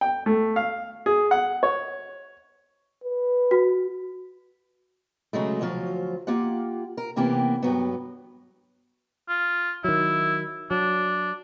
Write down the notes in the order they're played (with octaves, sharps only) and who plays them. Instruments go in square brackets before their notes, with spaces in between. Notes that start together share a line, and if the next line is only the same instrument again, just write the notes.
[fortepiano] G5
A3
F5
G#4
F#5
C#5
[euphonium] B4
[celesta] F#4
[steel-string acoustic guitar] C#3 F#3 G#3 A3
D2 F3 F#3 F4
A#3 F4 G4 F#5
A#4
D#2 C3 E3 A#3 B3 G4
G2 F#3 B3
[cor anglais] F4
[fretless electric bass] D#3 F#3 [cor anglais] E4
[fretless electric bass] F#3 [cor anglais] D4